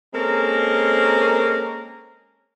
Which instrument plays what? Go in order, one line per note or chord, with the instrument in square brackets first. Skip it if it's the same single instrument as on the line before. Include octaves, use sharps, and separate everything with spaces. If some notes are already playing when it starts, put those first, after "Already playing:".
[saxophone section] G#3 A#3 C4 C#4 A4 A#4